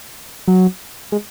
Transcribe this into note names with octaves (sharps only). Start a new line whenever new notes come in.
F#3
G#3